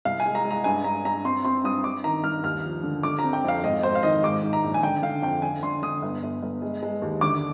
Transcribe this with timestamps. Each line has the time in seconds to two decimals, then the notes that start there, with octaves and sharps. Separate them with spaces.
0.05 C2 F5
0.20 G#5
0.26 G#3
0.35 A#5
0.45 G#3
0.51 A#5
0.64 G2 G#5
0.84 G2 A#5
1.05 G2 A#5
1.25 C4 C6
1.45 C4 C6
1.64 G2 D#6
1.84 G2 D6
2.04 D#3 A#5
2.24 G2 F6
2.43 D#2 F6
2.65 F3
2.83 D3
3.03 D3 D6
3.19 A#5
3.24 C4
3.33 G5
3.44 F2 F5
3.63 G#1 D#5
3.83 G#1 C5
3.95 F5
4.03 D#3 D#5
4.23 G#2 D6
4.44 G#2
4.53 A#5
4.64 A#1
4.74 G#5
4.82 D3 G5
5.02 D3 F5
5.22 F2 G5
5.42 D3 G#5
5.63 D3 C6
5.82 D3 D#6
6.02 G1
6.23 G1
6.42 G1
6.62 G#3
6.83 G#3
7.02 D#2
7.21 D3 D6